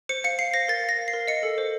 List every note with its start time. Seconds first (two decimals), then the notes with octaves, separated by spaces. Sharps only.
0.09 C5 C#7
0.24 F5 C#7
0.39 F5 C7
0.54 C5 A#6
0.68 A#4 A6
0.84 F5
0.89 A#6
0.98 F5
1.08 C7
1.13 A#4
1.28 D#5 C#7
1.43 A4
1.58 C5